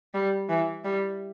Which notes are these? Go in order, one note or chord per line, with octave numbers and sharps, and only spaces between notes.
G3
E3
G3